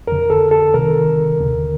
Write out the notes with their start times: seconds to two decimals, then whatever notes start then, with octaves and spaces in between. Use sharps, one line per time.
0.07 F2 D3 A#4
0.30 A4
0.51 A4
0.74 C2 C3 D#3 A#4
1.39 D#2 D3